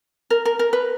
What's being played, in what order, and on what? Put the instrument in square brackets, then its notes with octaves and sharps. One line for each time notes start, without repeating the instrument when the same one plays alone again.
[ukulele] A#4
A#4
A#4
B4